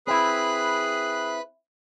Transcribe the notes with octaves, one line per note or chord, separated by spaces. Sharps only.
C4 E4 G#4 B4 B5 F#6